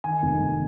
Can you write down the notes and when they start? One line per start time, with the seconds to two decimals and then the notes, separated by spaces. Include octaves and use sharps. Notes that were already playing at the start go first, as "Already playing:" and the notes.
0.04 D#3 G#5
0.23 F1
0.41 F1